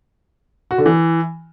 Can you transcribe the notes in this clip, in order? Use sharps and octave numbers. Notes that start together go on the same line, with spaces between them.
F#4
D3
E3